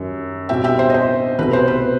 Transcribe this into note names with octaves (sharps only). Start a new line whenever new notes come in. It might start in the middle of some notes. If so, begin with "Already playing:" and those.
Already playing: F#2 D#3 G3
B2 G3 C4 E5 G5
E5 G5
C5
D#5
C5
C2 B2 A3 C4 B4
C5
B4